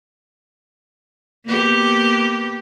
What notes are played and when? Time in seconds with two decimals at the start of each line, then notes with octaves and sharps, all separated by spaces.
1.45 A#3 B3 G4